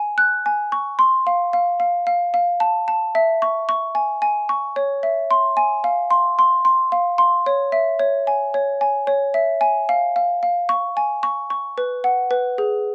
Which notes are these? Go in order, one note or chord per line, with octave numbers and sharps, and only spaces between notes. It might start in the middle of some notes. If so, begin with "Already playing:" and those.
Already playing: G#5
F#6
G#5
C#6
C6
F5
F5
F5
F5
F5
A5
A5
E5
C#6
C#6
G#5
G#5
C#6
C#5
E5
C6
G#5
F5
C6
C6
C6
F5
C6
C#5
E5
C#5
G#5
C#5
G#5
C#5
E5
G#5
F5
F5
F5
C#6
G#5
C#6
C#6
B4
F#5
B4
G#4